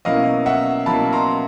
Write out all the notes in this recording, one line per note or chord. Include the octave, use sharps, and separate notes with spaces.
B2 F#3 A#3 C#4 E4 D#5 F5
E5 F#5
B2 F#3 A#3 C#4 E4 A5 B5
A#5 C6